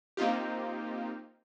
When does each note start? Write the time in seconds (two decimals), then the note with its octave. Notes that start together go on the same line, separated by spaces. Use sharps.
0.17 A#3 C4 D#4 F4 G4